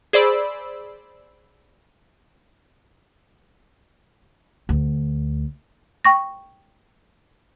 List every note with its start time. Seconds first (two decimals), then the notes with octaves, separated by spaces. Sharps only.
0.13 G#4 C5 D5 B5 E6
4.69 D2
6.05 G5 C#6 A#6